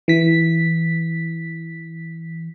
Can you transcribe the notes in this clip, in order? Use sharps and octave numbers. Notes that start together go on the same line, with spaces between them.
E3 B6